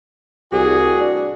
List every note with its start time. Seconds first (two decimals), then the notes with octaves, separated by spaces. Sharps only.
0.52 C2 A2 G3 F#4 G#4
1.00 D4